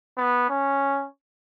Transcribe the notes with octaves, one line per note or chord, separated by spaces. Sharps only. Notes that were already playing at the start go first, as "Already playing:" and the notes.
B3
C#4